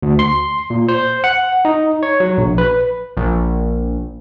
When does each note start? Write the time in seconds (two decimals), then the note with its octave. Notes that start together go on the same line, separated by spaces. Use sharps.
0.03 D2
0.19 C6
0.70 A#2
0.88 C5
1.24 F#5
1.65 D#4
2.03 C#5
2.20 F#3
2.38 A#1
2.58 B4
3.17 A#1